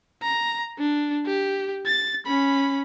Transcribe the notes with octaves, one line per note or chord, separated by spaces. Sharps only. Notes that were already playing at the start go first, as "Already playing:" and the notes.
A#5
D4
G4
A6
C#4 B5